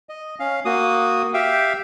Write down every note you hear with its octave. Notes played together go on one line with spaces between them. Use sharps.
D#5
C#4 F5
A#3 F#4 D#6
G4 E5 F5 G5